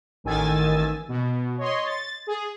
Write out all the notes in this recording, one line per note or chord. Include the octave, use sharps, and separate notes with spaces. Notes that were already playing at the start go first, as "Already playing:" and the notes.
A1 D#3 G#5 E6 A6
B2
C#5 D#5 C6
A6
G#4